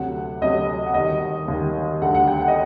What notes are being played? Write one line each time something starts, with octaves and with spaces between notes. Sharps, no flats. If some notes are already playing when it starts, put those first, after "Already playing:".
Already playing: D2 C3 F#3 F#5
D2 C3 F#3 D#5
F#5
D#2 D#3 G3 D#5
D#2 D#3 G3
D2 D3 G3 F#5
F#5
G5
F#5
D#5